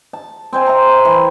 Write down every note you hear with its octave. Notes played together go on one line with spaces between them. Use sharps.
A5
C4 C5 G#5
E5 A#5
E3